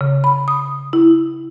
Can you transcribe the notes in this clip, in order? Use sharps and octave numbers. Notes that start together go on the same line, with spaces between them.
C#3
B5
D#6
E4